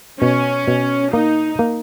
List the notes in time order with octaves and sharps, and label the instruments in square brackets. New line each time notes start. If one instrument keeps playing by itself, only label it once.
[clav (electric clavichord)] B2 [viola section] C#4
[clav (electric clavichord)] B2
[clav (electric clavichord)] A#3 [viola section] D#4
[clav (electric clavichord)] A#3